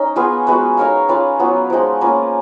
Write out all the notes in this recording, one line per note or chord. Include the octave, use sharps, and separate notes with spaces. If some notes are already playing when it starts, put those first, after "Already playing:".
Already playing: C#4 D#4 D#5
B3 F4 G#4 B4
G#3 B3 F#4 B4
D#4 A#4 C#5 F5
C#4 F4 B4 F5
F#3 B3 F4
F3 G#3 D#4
A#3 C#4 F4 B4